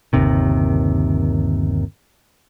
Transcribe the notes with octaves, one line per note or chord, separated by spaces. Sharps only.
G1 D#2 C3 D#3